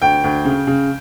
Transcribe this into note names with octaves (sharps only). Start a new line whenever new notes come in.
D2 G5
D2
C#3
C#3